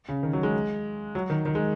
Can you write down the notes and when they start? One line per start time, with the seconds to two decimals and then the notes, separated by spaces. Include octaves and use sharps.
0.09 C#3
0.23 D#3
0.33 F#3
0.43 G#3
1.15 F#3
1.30 D#3
1.45 D#3
1.55 G#3